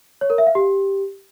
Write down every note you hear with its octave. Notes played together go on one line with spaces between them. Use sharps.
C#5
A#4
E5
F5
G4